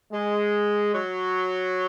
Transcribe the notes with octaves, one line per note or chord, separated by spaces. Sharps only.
G#3
F#3